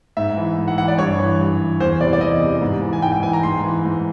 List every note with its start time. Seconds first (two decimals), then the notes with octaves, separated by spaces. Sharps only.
0.17 G#2 E5
0.37 E3
0.57 G#2
0.68 F#5
0.78 E3 F#5
0.88 D5
0.98 G2 C#5
1.19 E3
1.39 G2
1.60 E3
1.80 E2 C5
2.01 C3 E3 D5
2.13 D5
2.21 E2 D#5
2.41 C3 E3
2.61 G#2
2.82 E3
2.93 G#5
3.02 G#2 G5
3.13 G5
3.23 E3 G#5
3.33 A#5
3.43 G#2 C6
3.64 E3
3.84 G#2